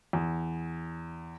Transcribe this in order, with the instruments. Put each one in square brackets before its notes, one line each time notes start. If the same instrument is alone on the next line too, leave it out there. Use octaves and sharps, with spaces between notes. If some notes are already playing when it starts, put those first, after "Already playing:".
[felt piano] E2